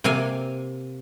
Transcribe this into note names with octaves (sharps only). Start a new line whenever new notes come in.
C3 A#3 F5 G#5